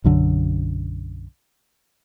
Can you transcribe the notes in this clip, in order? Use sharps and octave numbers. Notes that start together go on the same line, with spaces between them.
B1 F#2 D3